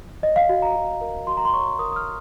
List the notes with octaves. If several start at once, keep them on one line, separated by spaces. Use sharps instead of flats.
C#5 D#5
F5
F#4
A#5
F#4
A#4
F#4 C6
A#5
C6
C#5 C#6
A#4 D#6
D#6
F6